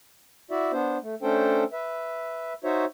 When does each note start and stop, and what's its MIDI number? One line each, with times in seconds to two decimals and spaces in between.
0.51 0.72 64
0.51 0.72 66
0.51 0.72 74
0.51 0.72 76
0.73 0.98 59
0.73 0.98 62
0.73 0.98 72
1.02 1.15 57
1.22 1.64 57
1.22 1.64 61
1.22 1.64 62
1.22 1.64 69
1.22 1.64 72
1.22 1.64 79
1.73 2.53 71
1.73 2.53 76
2.64 2.85 63
2.64 2.85 66
2.64 2.85 72
2.64 2.85 73
2.64 2.85 76